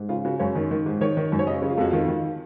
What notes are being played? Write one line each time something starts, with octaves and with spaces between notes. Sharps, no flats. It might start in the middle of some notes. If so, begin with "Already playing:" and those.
Already playing: G#2
C#3 F4
C#3 F#4
F#2 C#5
D#3
D#3
G#2
D#3 C#5
D#3
F#2
C#5
C#3 D#5
C#3
F4
F2 F#4
D#3 F4
D#3